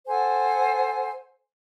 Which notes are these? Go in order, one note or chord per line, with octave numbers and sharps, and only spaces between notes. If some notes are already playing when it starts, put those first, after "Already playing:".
A4 C5 F#5 G#5